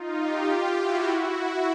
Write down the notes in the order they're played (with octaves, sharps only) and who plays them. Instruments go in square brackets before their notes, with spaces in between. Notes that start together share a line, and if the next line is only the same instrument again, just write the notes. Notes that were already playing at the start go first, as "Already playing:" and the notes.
Already playing: [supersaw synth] D#4 F4
F4 G4
E4 F#4
E4 F#4